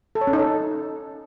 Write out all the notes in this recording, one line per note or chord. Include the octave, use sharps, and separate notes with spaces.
A4
C#5
C#4
D#4
A4